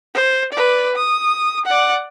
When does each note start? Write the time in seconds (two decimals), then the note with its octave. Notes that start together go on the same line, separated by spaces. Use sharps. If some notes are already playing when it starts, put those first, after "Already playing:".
0.14 C5
0.53 B4 D5
0.96 D#6
1.66 D5 F#5